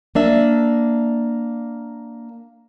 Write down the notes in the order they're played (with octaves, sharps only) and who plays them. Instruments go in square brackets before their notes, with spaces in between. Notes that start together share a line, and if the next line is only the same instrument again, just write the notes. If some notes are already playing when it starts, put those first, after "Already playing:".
[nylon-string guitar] A#3 D4 E5